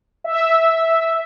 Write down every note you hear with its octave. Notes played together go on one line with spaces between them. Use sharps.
E5